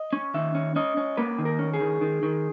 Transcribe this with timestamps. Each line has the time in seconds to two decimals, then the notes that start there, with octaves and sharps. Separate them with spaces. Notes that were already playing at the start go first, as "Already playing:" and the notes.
Already playing: D#5
0.13 C#4
0.34 D#3 E5
0.55 C#4
0.76 C#4 D#5
0.97 C#4
1.17 A#3 B4
1.38 D#3
1.45 A#4
1.59 C#4
1.74 G#4
1.80 D#3
2.01 D#3
2.23 D#3